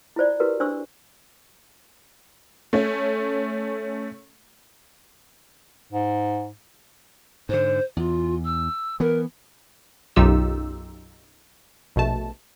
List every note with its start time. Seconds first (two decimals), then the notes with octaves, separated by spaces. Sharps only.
0.16 E4 F4 C5 D5
0.40 E4 F#4 G4 A#4 B4
0.60 D4 C5 C6 C#6 E6
2.73 A3 C#4
5.92 G#2
7.49 G#2 D3 C5
7.97 E2 F4
8.45 E6
9.00 E3 B3 A#4
10.16 B1 F#2 D#4 F4 G4 E6
11.96 A#1 B2 A3 A5